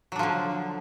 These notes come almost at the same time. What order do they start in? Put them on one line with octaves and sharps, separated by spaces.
F#3 D4 F3 D3